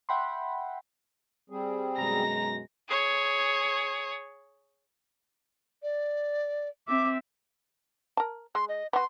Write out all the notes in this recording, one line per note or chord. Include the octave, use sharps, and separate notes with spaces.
E5 F#5 G5 B5 C6
G3 C4 G#4
F#2 B2 G#3 A#5 A#6
G#4 C#5
D5
C4 E5 D6
A#4 A5
G#3 C6
D#5
B3 F#4 C6